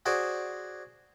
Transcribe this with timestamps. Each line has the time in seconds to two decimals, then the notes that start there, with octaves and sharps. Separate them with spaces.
0.06 F#4 G#4 C5 D5